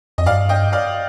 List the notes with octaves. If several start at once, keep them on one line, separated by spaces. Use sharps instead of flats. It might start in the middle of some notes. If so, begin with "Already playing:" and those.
F2 D#5
G2 D5 F5
D#5 G5
D5 F5